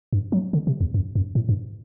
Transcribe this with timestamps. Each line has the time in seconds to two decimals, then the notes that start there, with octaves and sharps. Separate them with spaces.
0.13 G2
0.32 F#3
0.53 D3
0.67 C3
0.81 E2
0.94 F#2
1.15 F#2
1.35 A2
1.49 G2